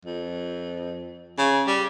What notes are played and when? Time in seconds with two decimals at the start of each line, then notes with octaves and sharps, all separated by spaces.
0.05 F2
1.38 C#3
1.67 G3